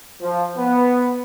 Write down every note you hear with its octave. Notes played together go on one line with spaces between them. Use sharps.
F3
B3